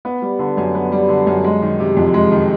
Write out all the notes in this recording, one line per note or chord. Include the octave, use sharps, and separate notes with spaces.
B3
G3
D3
F#2
B3
G3
D3
F#2
G#3
D#3
C3
F2
G#3
D#3